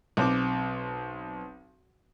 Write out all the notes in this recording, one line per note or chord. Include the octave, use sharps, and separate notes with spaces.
B1 C4 D6